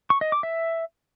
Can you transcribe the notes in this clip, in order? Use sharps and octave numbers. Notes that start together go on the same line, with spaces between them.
C#6
D#5
D6
E5